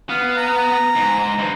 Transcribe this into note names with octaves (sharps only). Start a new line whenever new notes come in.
B3 F5
A#5
G#2
G2